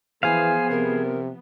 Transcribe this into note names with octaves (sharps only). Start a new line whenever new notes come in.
E3 F3 B3 G#4 C5 F5 G#5
C3 A#4